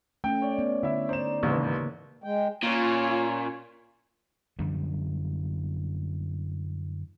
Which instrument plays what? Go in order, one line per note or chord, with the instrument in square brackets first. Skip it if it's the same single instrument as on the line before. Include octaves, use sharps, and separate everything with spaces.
[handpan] A3 C#4 [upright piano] G5
[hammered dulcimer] C#5 D5
[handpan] B3
[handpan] D3 [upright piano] E4 E5
[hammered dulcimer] D#4 D5 [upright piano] C5 E7
[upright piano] A1 D#2 G#2 [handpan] C#3 A#3 B4
[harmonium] G#3 G5
[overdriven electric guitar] A#2 [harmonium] C#4 [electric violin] F4 C#5
[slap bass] F#2 D3 F3 G3